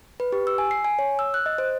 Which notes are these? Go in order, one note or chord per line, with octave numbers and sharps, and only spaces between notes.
B4
G4
E6
G#5
C7
G#5
C#5
E6
F#6
D#5
C5